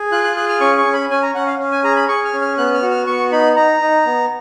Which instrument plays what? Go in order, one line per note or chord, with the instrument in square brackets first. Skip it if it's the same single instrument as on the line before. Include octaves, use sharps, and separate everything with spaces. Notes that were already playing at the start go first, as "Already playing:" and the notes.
Already playing: [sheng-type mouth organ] G#4
F4 F#6
F#6
G#4 F#6
F6
C#4 C#6
C#6
C#4
B5
C#4 G#5
A#5
C#4 F#5
F5
C#4
G#5
G#4 A#5
B5
G#4 C#6
F6
C#4
F6
B3 F#6
F6
F#4
F6
B3 C#6
D#4 B5
D#4 A#5
D#4
B3